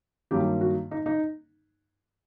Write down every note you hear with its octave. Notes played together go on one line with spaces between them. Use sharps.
G2 D#3 F#3 A#3 G4
F#4
D#4
D#4